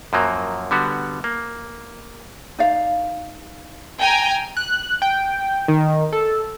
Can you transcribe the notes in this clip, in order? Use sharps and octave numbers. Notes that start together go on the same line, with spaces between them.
F#2 F3 F#3 A#3
D3 G3 B3 F#4
A#3
D#4 D5 F5
G5 G#5 A#5
F#6
G5
D#3
A4